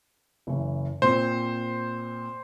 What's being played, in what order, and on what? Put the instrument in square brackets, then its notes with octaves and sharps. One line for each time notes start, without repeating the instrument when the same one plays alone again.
[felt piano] F#1 E3
[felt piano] A#2 C4 [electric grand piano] C5